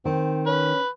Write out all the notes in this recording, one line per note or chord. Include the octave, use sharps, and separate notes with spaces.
D#3 C4
C#4 B4